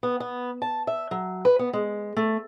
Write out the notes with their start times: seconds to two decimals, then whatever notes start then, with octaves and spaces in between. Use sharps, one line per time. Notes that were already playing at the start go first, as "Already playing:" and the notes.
0.03 B3
0.20 B3
0.62 A5
0.87 E5
1.11 F#3
1.45 B4
1.59 B3
1.73 G#3
2.17 A3